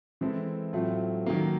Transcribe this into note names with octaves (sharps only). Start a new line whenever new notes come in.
E3 G#3 C4 E4 A4
A2 F#3 A3 C4 F4
D#3 F#3 A#3